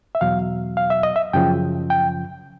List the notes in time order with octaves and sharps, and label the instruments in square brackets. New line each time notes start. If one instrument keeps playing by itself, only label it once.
[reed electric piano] E5
E2 B2 F#3 F5
F5
E5
D#5
E5
F#2 C#3 F3 G5
G5